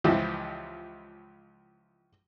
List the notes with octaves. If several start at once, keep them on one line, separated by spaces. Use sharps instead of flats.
C#2 E3 F3 G4 E5